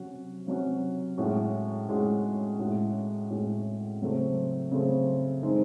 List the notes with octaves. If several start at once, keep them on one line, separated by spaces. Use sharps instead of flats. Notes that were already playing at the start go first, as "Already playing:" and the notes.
Already playing: C3 F#3 C#4 F#4
C3 F#3 C#4 F#4
A2 G#3 C#4 F#4
A2 G#3 C#4 F#4
A2 G#3 C#4 F#4
A2 G#3 C#4 F#4
C#3 F#3 A3 C4
C#3 F#3 A3 C4
D#3 G#3 C4 D#4 G#4